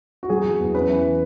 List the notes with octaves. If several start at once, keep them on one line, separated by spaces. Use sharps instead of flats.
F#4
F#3 G#4
F#3
E2
C#4 B4
E3